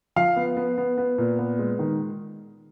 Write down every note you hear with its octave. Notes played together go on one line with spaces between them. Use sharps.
F3 F5
B3
B3
B3
B3
A#2
B3
G#3
D#3